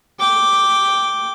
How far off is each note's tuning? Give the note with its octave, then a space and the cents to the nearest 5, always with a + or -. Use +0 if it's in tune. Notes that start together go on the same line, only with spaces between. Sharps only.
G5 +0 D6 +0